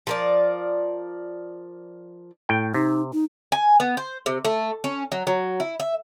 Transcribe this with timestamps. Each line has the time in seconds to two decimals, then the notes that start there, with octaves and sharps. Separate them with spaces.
0.07 F3 A#4 D5
2.49 A2 G5
2.74 C3 D#4
3.13 D#4
3.52 G#5
3.80 B3
3.97 C5
4.26 C3
4.45 A3
4.84 C#4
5.12 F#3
5.27 F#3
5.60 E4
5.80 E5